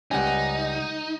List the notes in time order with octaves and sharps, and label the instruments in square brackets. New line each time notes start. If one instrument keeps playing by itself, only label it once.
[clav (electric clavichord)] C#2 G3 C#4 [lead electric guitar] D#4 [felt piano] F#5 G#5